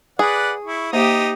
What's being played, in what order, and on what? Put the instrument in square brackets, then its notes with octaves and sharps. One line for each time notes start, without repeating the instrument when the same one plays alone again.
[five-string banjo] G#4 [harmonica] B4 D5 F#5
[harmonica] E4 C#6
[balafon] A#3 C5 E5 [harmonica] D#4 [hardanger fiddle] G4 D#6